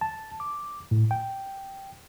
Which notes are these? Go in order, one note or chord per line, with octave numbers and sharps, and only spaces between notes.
A5
D6
A2
G5